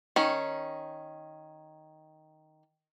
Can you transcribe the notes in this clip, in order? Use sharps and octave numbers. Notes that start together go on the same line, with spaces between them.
D#3 C#4